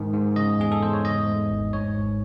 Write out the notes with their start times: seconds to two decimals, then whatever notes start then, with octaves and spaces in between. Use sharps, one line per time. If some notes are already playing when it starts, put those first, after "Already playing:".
Already playing: G#2 D#3
0.14 G#2
0.36 C#3 D#5
0.59 E2 G#4
0.72 A4
0.83 E2 C5
0.93 C#5
1.05 G#2 D#5
1.28 A3
1.50 G#1
1.73 G#2 C#5
1.96 G#1